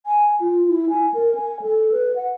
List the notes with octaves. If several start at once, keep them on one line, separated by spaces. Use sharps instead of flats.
G#5
F4
E4
G#5
A#4
G#5
A4
B4
F#5